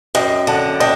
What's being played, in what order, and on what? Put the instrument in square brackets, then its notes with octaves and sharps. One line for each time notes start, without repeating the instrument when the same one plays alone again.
[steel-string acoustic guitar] F#2 [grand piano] D#5 G5
[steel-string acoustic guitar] D3 [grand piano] F#5 A5
[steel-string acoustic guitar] D4 [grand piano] D#5 G5